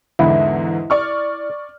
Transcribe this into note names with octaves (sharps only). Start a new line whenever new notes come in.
E2 G#2 D3 E4
D5 C#6 F6